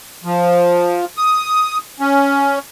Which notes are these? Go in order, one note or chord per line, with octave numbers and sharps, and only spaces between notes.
F3
D#6
C#4